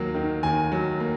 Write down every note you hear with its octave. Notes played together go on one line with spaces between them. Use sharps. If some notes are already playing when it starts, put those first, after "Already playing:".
Already playing: D#2 F#3 A#3
D#3
D#2 G#5
F#3
A#3